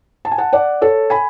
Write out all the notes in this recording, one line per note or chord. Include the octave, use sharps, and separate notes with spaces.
A5
G#5
F#5 A5
D5 F#5
A4 C#5
G#5 B5